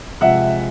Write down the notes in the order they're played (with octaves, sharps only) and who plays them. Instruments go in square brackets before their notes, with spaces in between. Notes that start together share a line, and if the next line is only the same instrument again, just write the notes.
[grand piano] C3 F3 G#3 E5 F#5